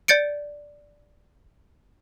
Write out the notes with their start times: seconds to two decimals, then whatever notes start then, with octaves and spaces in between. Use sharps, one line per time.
0.08 D5 G6 A6 C#7 D7